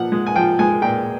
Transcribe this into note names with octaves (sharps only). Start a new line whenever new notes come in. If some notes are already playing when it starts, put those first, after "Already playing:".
Already playing: A#2 F3 F#5
G#3
G#5
F3 G5
G#3 G#5
A#2 G5